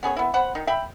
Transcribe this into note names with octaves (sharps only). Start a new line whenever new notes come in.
B3 C#4 G#4 C#5
B3 E4
B3 C5 F#5 B5
D#3 D#4
E5 G5 B5